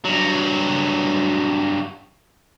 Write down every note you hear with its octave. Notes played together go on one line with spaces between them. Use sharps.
G2 F#3